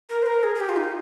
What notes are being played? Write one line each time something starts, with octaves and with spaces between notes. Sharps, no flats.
A#4
C5
A#4
G#4
G#4
G4
F4
D#4